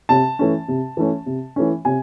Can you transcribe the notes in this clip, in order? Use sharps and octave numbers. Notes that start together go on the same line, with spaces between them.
C3 A5
E3 A3 C#4
C3
E3 A3 C#4
C3
E3 A3 C#4
C3 G#5